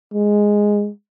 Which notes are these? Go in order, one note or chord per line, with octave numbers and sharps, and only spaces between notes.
G#3